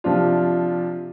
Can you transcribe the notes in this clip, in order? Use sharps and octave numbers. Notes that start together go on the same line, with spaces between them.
C3 F3 D4 F4